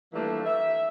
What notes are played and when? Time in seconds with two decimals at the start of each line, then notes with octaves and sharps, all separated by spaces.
0.13 E3 F3 G3 A3 A#3 D4
0.45 E5